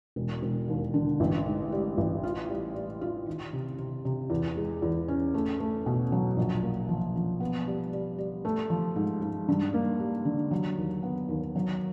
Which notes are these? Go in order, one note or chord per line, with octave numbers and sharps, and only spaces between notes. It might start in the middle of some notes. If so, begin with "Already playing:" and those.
E1
E1
D#2
D3
A1
G#2
G3
A1
F4
G3
G3
F4
D#3
C3
C3
C3
E2
G#3
E2
C#4
A3
A3
B2
F#3
A#1
A#3
F3
F3
B3
G3
G3
G3
A3
F3
G#2
G#2
G2
A#3
G3
D3
F#3
D#2
B3
D#2
F#3